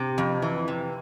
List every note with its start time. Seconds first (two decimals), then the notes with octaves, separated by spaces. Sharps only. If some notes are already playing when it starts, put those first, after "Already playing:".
Already playing: C3
0.18 F2
0.42 E3
0.68 C3